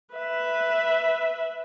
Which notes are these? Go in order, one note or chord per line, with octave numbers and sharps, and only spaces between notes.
B4 E5